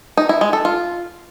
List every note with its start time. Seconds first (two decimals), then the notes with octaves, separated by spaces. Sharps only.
0.17 D#4
0.29 E4
0.41 G#3
0.53 A4
0.65 F4